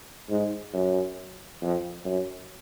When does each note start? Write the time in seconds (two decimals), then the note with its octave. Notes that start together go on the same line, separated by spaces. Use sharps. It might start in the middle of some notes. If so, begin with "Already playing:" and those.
0.30 G#2
0.73 F#2
1.62 F2
2.05 F#2